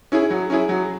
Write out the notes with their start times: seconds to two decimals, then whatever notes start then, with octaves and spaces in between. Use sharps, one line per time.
0.12 C#4 E4 G#4
0.30 F#3
0.50 C#4 E4 G#4
0.69 F#3